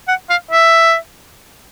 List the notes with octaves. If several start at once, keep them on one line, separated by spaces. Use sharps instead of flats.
F#5
F5
E5